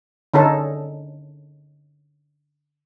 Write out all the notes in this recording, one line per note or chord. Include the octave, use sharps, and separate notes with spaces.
D3 C#4 D#4 A4